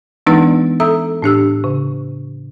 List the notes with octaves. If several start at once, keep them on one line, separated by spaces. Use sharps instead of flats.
E3 G#3 B3 D4 D#4 B4
A4 E5 A#5 D#6 E6
A2 D4 G4 E6
C#3